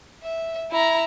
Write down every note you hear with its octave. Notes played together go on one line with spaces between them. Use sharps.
E5
E4 A#5